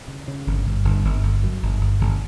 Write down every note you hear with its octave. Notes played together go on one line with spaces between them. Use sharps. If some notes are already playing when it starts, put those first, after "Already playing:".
C#3
C#3
G1
G1
G1
G1
G1
F#2
G1
G1
G1